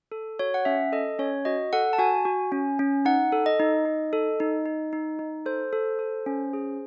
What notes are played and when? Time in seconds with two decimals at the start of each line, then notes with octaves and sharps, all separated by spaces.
0.12 A4
0.39 F#4 C#5
0.54 F#5
0.65 C#4 E5
0.92 A4 D#5
1.19 C#4 C#5
1.45 F#4 D#5
1.73 A4 F#5
1.93 A5
1.98 F#4 G#5
2.25 F#4
2.52 C#4
2.79 C#4
3.05 D#4 F#5
3.32 A4
3.46 D#5
3.60 D#4
3.85 D#4
4.13 A4
4.40 D#4
4.66 D#4
4.93 D#4
5.19 D#4
5.46 A4 C5
5.73 A4
5.99 A4
6.26 C#4
6.53 G#4